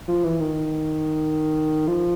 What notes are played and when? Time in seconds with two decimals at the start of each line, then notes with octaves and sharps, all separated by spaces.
0.08 F3
0.24 E3
0.40 D#3
1.87 F3